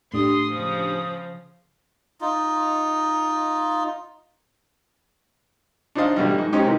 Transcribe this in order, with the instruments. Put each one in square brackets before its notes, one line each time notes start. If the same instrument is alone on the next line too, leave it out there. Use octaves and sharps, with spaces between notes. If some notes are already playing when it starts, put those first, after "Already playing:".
[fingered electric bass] A2 [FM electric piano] A3 D4 G4 [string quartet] C6 [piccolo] D#6
[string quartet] C#3 F3
[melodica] D#4 F4
[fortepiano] D4 D#4 F4 C5 D#5 F5
A1 B2 D3 F3 G3
G#2
G#3 C4 C#4 D#4 G4
C3 D#3 E3